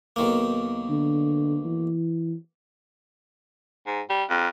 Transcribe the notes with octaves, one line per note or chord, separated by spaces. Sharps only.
B1 D#3 A#3
D3
E3
G#2
G3
F2